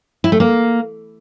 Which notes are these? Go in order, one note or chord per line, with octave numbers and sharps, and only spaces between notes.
E4
A3
A#3